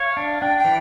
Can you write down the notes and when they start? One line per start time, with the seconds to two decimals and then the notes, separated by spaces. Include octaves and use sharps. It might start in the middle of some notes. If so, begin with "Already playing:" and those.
Already playing: C#5 F5
0.17 D4
0.41 D4 G5
0.58 G5
0.65 E3